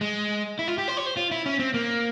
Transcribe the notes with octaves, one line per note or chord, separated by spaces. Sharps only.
G#3
E4
F4
G4
C5
C#5
C5
F4
E4
C#4
C4
A#3